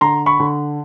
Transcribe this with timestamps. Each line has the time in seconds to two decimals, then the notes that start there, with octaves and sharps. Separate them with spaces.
0.01 D3 A#5 C6
0.26 B5 C#6
0.40 D3